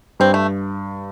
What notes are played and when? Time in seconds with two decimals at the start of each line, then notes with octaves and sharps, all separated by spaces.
0.20 G2 C4
0.34 A3